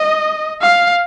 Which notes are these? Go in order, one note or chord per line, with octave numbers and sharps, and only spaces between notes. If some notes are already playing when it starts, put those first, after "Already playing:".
Already playing: D#5
F5